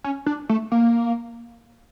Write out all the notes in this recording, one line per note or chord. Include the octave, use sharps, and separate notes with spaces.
C#4
D4
A3
A#3